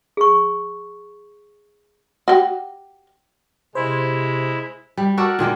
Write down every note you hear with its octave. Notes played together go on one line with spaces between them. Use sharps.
G#4 C#6
F#4 G4
C3 G#3 E4 C5
G3
F#4 A4 A#4 D5
A#2 D#3 G#3 A#3